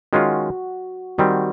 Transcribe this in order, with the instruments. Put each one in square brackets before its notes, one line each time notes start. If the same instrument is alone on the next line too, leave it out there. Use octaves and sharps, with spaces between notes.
[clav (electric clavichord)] D#3 G#3 C#4 F4 [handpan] F#4
[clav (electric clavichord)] D#3 G3 C4 [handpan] F#4